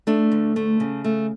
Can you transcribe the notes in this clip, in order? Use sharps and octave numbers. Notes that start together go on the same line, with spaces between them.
A3 D4
D2
A3
C#3
A3